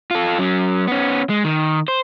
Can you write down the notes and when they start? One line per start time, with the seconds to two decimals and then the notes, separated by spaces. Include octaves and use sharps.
0.11 F4 A4
0.39 F#3 C#4
0.87 B3 C#4
1.29 G#3
1.45 D#3
1.88 C5